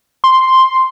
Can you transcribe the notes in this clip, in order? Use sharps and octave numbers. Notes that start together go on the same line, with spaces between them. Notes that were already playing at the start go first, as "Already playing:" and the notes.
C6